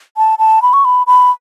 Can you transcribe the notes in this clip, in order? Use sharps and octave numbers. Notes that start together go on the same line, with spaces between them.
A5
A5
B5
C#6
B5
B5